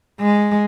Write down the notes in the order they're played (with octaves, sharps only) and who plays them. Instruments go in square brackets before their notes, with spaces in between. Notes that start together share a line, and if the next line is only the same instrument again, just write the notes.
[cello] G#3